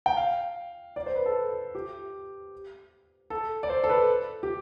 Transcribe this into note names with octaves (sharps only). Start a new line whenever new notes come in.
G5
F5
D5
C5
B4
A4
G4
A4
D5
C5
A4
B4
G4